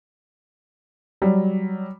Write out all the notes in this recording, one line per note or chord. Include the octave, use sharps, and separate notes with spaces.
F#3 G3